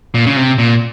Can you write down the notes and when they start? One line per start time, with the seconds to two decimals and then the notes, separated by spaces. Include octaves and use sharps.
0.14 A#2
0.26 C#3
0.37 C3
0.58 A#2